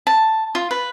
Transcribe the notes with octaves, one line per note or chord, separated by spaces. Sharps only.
A5
F4
B4